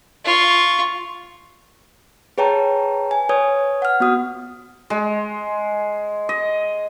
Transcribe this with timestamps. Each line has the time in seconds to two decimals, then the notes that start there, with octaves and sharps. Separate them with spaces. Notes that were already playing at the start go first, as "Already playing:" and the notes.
0.25 F4 C#6
2.38 G#4 B4 C#5 G5 A5 A#5
3.11 G#5
3.29 B4 C#5 D#6 G#6
3.82 F#5 F6
4.00 B3 F#4 D#6
4.90 G#3
6.29 D#5